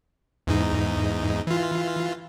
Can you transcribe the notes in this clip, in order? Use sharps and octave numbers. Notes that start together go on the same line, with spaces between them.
E2 G#2 D#4
E3 F4